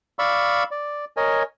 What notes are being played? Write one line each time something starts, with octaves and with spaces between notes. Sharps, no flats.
D5 F5 B5 C#6 E6
D5
A#4 C#5 D#5 G#5